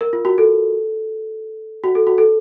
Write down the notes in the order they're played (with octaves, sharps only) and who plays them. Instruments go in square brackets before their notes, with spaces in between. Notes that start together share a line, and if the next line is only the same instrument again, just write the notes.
[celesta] A#4
F4
F#4
A4
F#4
A4
F#4
A4